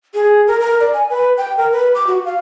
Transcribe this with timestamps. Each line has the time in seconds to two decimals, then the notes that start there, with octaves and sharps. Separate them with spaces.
0.14 G#4
0.47 A#4
0.60 A#4
0.80 D5
0.94 G#5
1.10 B4
1.37 G5
1.57 A#4
1.72 B4
1.95 D6
2.07 F#4
2.25 F5